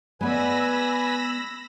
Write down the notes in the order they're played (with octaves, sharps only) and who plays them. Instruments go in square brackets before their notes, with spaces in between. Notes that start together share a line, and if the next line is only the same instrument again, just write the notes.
[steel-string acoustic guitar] G#3 B3 D5 [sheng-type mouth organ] B4 G#5 [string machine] B5 E6 A#6